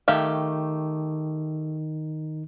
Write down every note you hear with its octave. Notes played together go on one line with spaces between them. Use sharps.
D#3 A3 D#4 G4 F5